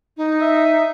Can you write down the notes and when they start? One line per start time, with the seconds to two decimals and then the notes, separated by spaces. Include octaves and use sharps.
0.17 D#4
0.41 E5